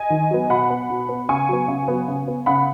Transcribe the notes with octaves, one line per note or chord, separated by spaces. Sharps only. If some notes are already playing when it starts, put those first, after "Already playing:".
Already playing: D#5 G#5
D#3
F#3 B3
B2 F#5 B5
B3
B2
B3
C#3 G#5 C#6
F#3 B3
C#3
F#3 B3
C#3
B3
C#3 F#5 B5